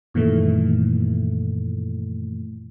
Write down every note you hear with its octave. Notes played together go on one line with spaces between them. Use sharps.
F#2 A#2 D#3 E3 A3